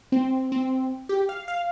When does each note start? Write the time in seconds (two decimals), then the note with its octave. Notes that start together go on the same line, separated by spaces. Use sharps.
0.12 C4
0.52 C4
1.09 G4
1.29 F5
1.48 F5